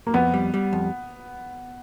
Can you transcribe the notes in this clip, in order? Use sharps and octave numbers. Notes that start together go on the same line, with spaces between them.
A#3
F2 B3
G3
G3
F2